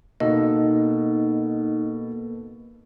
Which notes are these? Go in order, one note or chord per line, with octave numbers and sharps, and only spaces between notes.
B2 A#3 B3 D#4 A4 D#5